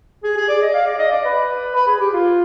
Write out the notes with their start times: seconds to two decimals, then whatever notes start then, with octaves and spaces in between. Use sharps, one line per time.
0.24 G#4
0.37 G#4
0.49 D5
0.62 D#5
0.74 F5
0.86 D5
0.99 D#5
1.11 D5
1.25 B4
1.76 B4
1.87 G#4
2.00 G4
2.13 F4